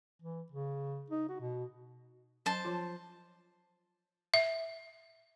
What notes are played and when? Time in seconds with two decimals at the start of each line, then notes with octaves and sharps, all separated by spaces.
0.22 E3
0.52 C#3
1.10 D#4
1.29 F#4
1.41 B2
2.46 F#3 C#4 C5 A5
2.65 F3 F4
4.34 E5